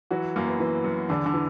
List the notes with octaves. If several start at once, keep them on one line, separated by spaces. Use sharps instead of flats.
E3 F#3 F#4
F#2 A#3
B3
E3 B3
F#2
E2 D3 D4
D3 D4
E3